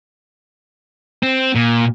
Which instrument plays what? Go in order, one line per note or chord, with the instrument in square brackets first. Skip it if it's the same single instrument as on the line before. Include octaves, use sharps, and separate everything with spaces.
[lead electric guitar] C4
A#2